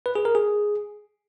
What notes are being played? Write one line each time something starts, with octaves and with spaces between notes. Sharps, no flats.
B4
G#4
A#4
G#4